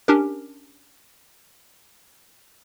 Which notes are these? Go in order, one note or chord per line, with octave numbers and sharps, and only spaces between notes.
C#4 D4 G4 A#4